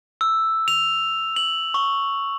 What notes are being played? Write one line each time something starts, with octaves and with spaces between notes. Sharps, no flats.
E6
F7
F#7
C#6